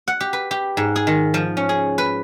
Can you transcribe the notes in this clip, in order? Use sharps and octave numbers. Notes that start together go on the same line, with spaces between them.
F#5
G4
B4
G4
G#2
G#4
D#3
F3
C#4
G#4
B4